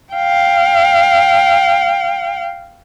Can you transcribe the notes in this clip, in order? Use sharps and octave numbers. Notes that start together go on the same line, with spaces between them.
F5 G5